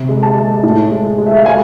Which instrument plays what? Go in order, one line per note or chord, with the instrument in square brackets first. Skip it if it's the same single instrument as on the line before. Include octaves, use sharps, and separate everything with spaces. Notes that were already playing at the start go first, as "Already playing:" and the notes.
Already playing: [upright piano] C3
G#3
A5
G#3
A2
G#3
G#3
E5
F5
G#3 G#5